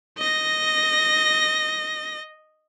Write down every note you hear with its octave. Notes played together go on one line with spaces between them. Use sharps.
D#5 A#6